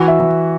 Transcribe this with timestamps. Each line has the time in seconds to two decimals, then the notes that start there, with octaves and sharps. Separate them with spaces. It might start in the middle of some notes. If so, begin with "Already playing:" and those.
Already playing: E3 F#4
0.08 E5
0.20 E3